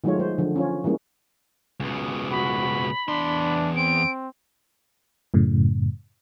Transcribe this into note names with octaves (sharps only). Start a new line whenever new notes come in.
D#3 F#3 G#3 A3 F4 C#5
G#3 C5
D3 F3
C#4 F4 C#5
E3 G3 G#3 A#3 C#4
C#2 B2
F#4 B5
E2 D4 C6
C4 D7
F#2 A2 C#3